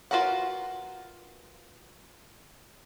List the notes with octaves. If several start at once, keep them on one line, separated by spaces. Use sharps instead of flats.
F4 F#4 A#4 B4 F#5